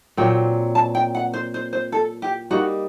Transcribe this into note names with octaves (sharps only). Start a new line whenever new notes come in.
A#2 F#3 C4 G5
A5
G5
F#5
C5
C5
C5
A4
G4
G3 A#3 D#4 F#4